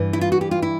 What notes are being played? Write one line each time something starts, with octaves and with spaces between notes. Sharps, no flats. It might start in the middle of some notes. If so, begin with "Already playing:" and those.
Already playing: G2 E3
E4
F4
F#4
G4
F4
E4